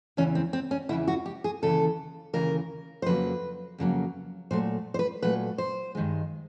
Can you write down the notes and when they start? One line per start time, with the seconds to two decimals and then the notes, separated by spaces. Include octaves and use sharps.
0.17 E2 C#3 E3 C#4
0.35 C4
0.53 C4
0.71 C#4
0.89 E2 C#3 E3 E4
1.08 F#4
1.26 G4
1.44 G#4
1.62 D#2 C#3 E3 A4
2.33 D#2 C#3 E3 A#4
3.02 C5
3.06 F2 C#3 F#3 A#3 B4
3.78 F2 C#3 F#3 A#3
4.51 A#2 F#3 A3 C5
4.94 C5
4.99 B4
5.22 A#2 F#3 A3 B4
5.58 C5
5.95 G2 D#3 G#3